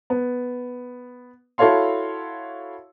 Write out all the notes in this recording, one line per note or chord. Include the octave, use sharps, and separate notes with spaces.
B3
E4 F#4 A4 C#5 F5 C6